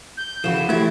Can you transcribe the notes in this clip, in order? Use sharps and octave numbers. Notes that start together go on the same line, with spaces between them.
G6
C#3 E3 F3 F#4 E7
F#3 A3 E4 G4 G#6